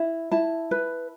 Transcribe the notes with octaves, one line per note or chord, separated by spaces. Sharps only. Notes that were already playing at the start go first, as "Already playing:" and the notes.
Already playing: E4
E4 A5
B4